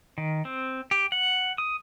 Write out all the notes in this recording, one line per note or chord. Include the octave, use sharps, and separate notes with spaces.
D#3
C4
G4
F#5
D#6